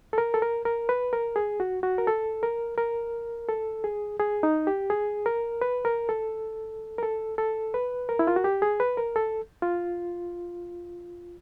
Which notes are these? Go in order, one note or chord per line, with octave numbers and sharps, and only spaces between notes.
A4
A#4
A4
A#4
A#4
B4
A#4
G#4
F#4
F#4
A#4
A4
A#4
A#4
A4
G#4
G#4
D#4
G4
G#4
A#4
B4
A#4
A4
A#4
A4
A4
B4
A#4
E4
F4
F#4
G4
G#4
B4
A#4
A4
F4